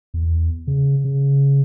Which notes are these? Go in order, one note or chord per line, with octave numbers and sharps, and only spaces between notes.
E2
C#3
C#3